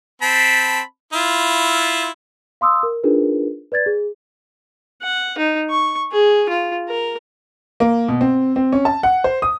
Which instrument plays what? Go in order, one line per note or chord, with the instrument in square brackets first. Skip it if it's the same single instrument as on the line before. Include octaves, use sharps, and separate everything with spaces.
[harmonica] C4 A5 B5
E4 F4
[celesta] F5 C6 D#6 E6
A#4
D4 D#4 F4 G#4 A#4 B4
B4 D5 G#6 A6
G#4
[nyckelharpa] F#5
D#4
C#6
G#4
F4
A#4
[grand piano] A#3
B2
C4
C4
C#4
A5
F#5
C5
D#6